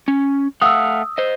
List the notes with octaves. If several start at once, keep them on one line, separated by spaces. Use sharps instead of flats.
C#4
A3 F5 F#5 D#6 E6
C5 D#5